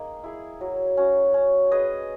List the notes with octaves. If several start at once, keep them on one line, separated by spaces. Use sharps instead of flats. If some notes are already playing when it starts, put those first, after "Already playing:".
Already playing: A#3 D#4 G#4
E4 G#4
F#3
C#4 F#4
C#4
G#4 B4 D#5